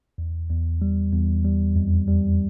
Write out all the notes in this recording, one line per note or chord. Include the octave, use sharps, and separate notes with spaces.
E2
E2
G3
E2
G3
F2
G3